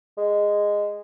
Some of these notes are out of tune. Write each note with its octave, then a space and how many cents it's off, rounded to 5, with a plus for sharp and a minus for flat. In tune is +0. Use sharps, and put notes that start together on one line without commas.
G#3 -10